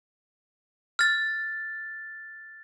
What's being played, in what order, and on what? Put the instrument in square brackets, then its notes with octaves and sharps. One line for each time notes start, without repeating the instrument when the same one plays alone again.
[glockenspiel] F6 A6